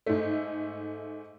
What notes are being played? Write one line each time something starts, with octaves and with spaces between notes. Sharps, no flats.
G#2 A3